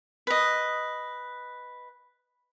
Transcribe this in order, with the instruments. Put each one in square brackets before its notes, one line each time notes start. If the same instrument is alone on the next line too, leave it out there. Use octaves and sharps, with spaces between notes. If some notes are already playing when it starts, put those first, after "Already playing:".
[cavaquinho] B4 D#5